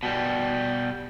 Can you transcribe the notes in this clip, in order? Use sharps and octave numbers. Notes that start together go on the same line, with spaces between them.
B2 G3